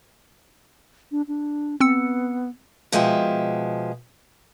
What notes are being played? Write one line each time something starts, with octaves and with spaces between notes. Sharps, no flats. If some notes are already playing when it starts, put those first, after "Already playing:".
D4
D4
B3 C4 E6 C#7
B2 F3 G#3 E5 G5